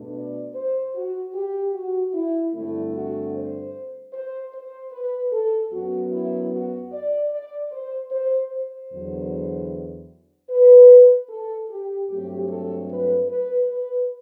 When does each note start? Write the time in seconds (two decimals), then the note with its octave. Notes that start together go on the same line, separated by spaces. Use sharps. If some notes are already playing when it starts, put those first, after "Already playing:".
Already playing: B2 A3 D4
0.15 D5
0.55 C5
0.95 F#4
1.34 G4
1.74 F#4
2.14 E4
2.54 G2 D3 A3 C4 E4
2.93 F#4
3.34 C5
4.13 C5
4.54 C5
4.92 B4
5.32 A4
5.72 F#2 F#3 B3 F#4
6.12 E4
6.52 F#4
6.93 D5
7.32 D5
7.71 C5
8.12 C5
8.51 C5
8.91 E2 D3 F#3
10.50 B4
11.29 A4
11.70 G4
12.09 G2 F#3 A3 C4 G4
12.49 A4
12.89 B4
13.29 B4
13.68 B4